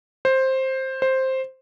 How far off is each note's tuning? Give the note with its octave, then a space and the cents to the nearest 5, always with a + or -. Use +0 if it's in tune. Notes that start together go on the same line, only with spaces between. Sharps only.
C5 +10
C5 +5